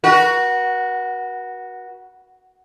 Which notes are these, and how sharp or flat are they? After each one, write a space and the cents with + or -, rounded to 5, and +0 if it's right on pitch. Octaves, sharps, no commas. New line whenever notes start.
F#4 +0 B4 -45